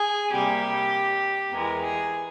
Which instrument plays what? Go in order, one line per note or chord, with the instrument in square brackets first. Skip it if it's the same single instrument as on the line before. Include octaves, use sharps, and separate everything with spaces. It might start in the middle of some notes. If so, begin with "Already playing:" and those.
Already playing: [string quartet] G#4
C3 G3 A#3 G4
E2 E3 G#3 A#4
G#4